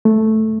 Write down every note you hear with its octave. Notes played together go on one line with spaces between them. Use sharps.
A3